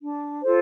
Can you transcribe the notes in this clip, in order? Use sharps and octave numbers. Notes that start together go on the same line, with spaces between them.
D4
F4 A4 C5